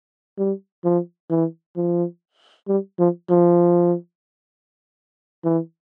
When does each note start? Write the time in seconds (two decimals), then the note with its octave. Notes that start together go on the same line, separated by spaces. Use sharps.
0.38 G3
0.84 F3
1.30 E3
1.76 F3
2.68 G3
2.99 F3
3.30 F3
5.44 E3